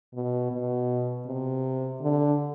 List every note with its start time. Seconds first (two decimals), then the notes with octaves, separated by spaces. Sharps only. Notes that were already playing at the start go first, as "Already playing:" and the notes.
0.14 B2
0.52 B2
1.26 C3
2.01 D3